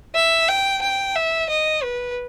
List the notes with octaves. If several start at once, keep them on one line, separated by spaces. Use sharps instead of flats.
E5
G5
G5
E5
D#5
B4